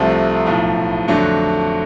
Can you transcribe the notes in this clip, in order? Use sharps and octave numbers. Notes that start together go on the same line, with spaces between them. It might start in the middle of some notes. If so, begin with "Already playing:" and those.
Already playing: C2 C3 F3 A3
B1 A2 F3
F2 D3 F#3 A3 D4